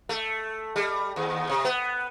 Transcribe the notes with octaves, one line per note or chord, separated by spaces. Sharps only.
A3
G3
D#2
C3
B3